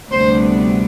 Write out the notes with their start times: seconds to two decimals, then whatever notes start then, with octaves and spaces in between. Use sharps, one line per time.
0.11 D2 C3 G3 B3 D4 C5